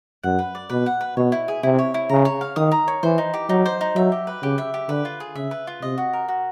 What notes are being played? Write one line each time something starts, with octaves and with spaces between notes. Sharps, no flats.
F#2 F#5
B4
D5
B2 B4
F#5
B4
B2 C#5
E4
G#4
C3 E4
C#5
E4
C#3 A#5
C#5
F5
D#3 D#6
A#5
C#5
E3 C5
D#4
G4
F#3 D#4
C5
D#4
F#3 E5
G4
B4
C#3 G4
E5
G4
D3 B4
F4
G#4
C#3 E5
B4
F4
C3 D#5
F#4
A#4
F#4